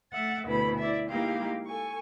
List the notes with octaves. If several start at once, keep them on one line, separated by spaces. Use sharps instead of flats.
A3 E5 F#5 A6
D2 B2 E4 B4 B5
E4 D5 E5
G#3 A#3 D#4 E4 G4 F5
A4 G#5 C#6